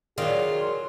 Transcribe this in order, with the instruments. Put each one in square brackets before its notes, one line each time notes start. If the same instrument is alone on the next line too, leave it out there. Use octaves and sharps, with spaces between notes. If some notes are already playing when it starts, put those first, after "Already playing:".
[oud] D#3 F#3 [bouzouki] F4 [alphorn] G#4 [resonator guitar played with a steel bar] D5